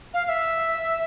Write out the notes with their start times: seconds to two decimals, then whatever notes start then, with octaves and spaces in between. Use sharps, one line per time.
0.14 F5
0.25 F5
0.29 E5